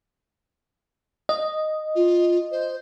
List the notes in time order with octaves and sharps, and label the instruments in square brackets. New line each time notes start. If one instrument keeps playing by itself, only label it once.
[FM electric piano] D#5
[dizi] F4
C5